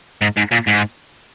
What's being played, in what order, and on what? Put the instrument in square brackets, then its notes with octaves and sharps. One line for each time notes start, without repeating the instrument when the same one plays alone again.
[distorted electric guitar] G#2
G#2
A#2
G#2